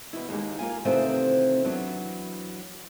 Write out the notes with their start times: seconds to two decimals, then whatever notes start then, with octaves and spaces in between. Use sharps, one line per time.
0.13 B2 E3 E4
0.29 D#2 G#3 G4
0.59 A#3 F4 G#5
0.85 C3 D#3 E3 A3 C4 F4
1.64 E3 F#3 B3 D4